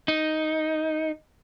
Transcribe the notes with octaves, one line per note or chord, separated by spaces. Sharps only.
D#4